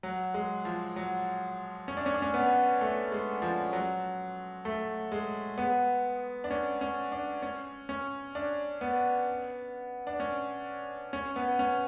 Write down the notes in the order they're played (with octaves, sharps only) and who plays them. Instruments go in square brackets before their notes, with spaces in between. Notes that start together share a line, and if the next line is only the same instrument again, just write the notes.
[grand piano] F#3
G#3
F3
F#3
C#4
D4
C#4
D4
C#4
B3
A3
G#3
F3
F#3
A3
G#3
B3
D4
C#4
C#4
D4
C#4
C#4
D4
B3
D4
C#4
C#4
B3
C#4